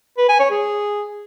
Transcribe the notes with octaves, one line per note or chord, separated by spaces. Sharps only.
B4
G#5
C#5
G#4